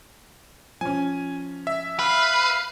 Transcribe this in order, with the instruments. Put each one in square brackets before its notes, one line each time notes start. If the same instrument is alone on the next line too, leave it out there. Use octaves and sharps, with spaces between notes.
[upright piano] F3 C#4 [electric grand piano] G#5
[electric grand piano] E5
[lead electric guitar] B4 [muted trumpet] F5